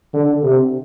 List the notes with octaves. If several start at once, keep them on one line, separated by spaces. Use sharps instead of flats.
D3
C3